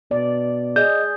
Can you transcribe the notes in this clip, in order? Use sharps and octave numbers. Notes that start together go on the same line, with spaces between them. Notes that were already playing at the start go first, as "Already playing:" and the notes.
B2 D5
G#4 D5 D#5 G6